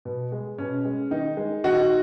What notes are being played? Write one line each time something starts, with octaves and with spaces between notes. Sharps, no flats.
B2
G#3
B2 C#4
G#3
D#3 D#4
G#3
D#3 D#4 F#4